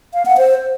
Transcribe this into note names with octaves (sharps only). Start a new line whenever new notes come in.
F5
F#5
C5